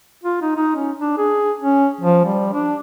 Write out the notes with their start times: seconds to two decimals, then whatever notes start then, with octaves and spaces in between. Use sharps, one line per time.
0.23 F4
0.41 D#4
0.56 D#4
0.75 C#4
0.97 D4
1.18 G#4
1.60 C#4
2.01 F3
2.25 G3
2.53 D4